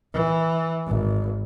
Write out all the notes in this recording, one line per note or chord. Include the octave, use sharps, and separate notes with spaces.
E3
G#1